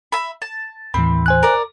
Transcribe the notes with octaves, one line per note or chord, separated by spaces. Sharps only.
E5 B5
A5
D#2 A2 E3 C4 B5
C5 G#5 F#6
A#4 D5